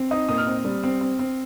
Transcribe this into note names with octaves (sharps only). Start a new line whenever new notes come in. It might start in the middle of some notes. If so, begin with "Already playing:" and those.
Already playing: C4
D#4 D#6
A#2 D#6
F6
C4
G3
C4
C4
C4